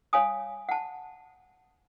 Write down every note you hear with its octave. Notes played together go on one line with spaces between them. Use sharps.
C#5 F5 G#5 D#6
F#5 A5